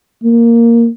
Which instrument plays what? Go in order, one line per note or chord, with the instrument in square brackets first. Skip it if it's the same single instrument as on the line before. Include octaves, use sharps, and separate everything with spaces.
[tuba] A#3